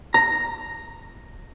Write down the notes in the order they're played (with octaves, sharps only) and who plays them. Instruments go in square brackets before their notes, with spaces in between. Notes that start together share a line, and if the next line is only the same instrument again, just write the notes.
[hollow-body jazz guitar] A#5